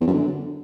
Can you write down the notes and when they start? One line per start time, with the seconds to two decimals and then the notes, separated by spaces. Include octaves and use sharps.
0.01 E2
0.07 F#2
0.14 D3